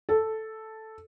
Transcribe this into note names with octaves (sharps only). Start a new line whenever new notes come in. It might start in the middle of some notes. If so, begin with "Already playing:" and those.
A4